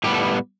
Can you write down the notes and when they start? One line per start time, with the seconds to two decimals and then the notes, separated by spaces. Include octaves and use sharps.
0.04 A2 G3 B3 G4
0.14 A4